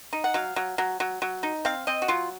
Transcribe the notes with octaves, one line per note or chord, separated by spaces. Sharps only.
D#4
F#5
F#3 F5
F#3
F#3
F#3
F#3
D#4
C4 F5
C4 D#5
F#4
F#3 F4